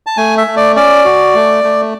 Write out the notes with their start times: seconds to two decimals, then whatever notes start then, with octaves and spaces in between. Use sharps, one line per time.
0.07 A5
0.17 A3 G#5
0.38 E5
0.47 A3
0.56 D5
0.76 C#4 D5
1.05 F#4
1.35 A3
1.64 A3